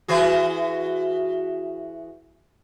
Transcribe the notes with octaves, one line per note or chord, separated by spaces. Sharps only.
E3 F#4 G#4